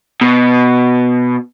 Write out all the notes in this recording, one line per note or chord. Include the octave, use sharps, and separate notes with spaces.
B2